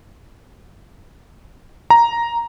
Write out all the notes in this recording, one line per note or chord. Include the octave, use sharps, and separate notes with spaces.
A#5